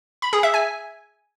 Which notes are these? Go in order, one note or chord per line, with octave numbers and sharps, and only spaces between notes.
B5
G#4
E5
G#5